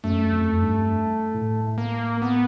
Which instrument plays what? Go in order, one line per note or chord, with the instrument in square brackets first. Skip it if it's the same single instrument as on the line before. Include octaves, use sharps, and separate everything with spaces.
[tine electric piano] F#2 [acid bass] A3
[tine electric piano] F2
G2
A2
[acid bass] A#3
B3